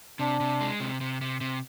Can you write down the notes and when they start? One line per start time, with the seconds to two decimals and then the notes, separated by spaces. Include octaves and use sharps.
0.19 C3 D4
0.40 C3
0.61 G#3
0.80 C3
1.01 C3
1.21 C3
1.41 C3